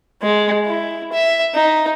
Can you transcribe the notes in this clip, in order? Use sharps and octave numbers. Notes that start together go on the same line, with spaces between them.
G#3
E4
E5
D#4